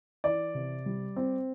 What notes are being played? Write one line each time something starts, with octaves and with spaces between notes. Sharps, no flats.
E3 D5
C3
G3
C4